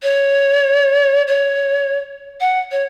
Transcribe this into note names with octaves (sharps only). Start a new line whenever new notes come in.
C#5
C#5
F#5
C#5